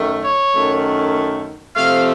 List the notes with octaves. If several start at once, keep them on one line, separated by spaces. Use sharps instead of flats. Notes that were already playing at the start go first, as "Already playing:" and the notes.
Already playing: F#2 D#3 A3
C#5
F#2 D#3 A3
C3 F3 A3 F5